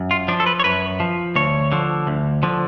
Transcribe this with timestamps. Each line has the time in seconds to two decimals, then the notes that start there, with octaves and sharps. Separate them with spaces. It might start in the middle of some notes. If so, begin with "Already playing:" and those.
Already playing: F#2
0.11 F4
0.28 F3 D4
0.40 A4
0.46 B4
0.60 C#5
0.64 F#2 B4
1.00 F3
1.36 D2 C#5
1.72 D3 F3
2.07 D2
2.43 D3 F3